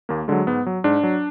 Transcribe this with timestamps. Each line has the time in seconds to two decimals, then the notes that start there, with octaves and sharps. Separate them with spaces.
0.09 D#2 A#3
0.28 D3 F#3 G#3
0.47 G#2 B3
0.66 F#3
0.84 G#2 D4
1.03 F#3